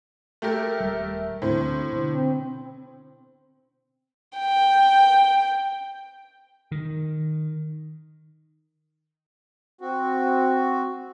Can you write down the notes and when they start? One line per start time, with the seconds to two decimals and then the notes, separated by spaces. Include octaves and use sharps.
0.42 A3 G4 A#4 E5
0.80 D#1 G3
1.42 D2 A2 D3 C4 C5
1.93 B2 D3
2.14 C4
4.38 G5
6.72 D#3
9.81 C4 F#4